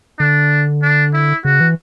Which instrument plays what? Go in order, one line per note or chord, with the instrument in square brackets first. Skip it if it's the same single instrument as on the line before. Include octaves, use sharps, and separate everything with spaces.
[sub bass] D3 [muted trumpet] D4
[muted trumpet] D4
E4
[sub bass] C#3 [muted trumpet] F#4
[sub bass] E3